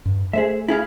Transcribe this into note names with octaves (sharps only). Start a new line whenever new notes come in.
G2
A3 G#4 C5 E5
E4 G#4 F5